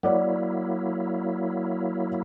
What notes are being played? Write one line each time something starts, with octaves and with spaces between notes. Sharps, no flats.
F#3 A#3 E4 C#5 D5 F#5